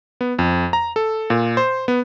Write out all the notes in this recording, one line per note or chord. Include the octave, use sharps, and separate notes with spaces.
B3
F2
A#5
A4
A#2
C5
B3